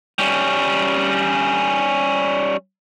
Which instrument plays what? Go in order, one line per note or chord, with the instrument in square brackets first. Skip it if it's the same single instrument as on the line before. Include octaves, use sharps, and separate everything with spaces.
[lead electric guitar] G3 C#4